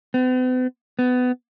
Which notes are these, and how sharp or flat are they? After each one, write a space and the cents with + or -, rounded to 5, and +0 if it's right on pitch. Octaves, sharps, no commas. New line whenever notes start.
B3 +45
B3 +20